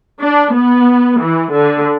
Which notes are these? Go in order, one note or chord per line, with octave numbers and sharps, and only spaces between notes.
D4
B3
E3
D3